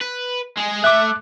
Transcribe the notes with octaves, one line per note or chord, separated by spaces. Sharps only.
B4
G#3 G#4
A3 E5 D6 F#6